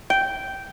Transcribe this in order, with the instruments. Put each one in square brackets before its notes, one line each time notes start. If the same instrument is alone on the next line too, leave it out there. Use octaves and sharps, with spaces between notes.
[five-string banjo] G5